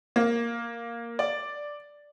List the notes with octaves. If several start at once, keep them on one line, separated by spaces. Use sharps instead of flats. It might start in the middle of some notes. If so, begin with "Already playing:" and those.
A#3
D5